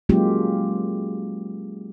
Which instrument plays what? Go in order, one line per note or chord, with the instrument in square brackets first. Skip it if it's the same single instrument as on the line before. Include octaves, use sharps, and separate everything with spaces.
[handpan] F#3 G#3 A#3 C#4 F4 G4